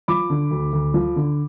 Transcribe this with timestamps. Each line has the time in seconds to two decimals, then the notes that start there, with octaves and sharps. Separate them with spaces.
0.08 F3 B5 D6
0.30 D3
0.51 D2
0.73 D2
0.94 F3
1.16 D3